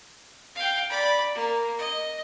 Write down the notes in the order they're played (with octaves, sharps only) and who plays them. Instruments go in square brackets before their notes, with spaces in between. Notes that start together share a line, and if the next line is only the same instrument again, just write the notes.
[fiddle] F5 G5
D5 B5
A#3
D#5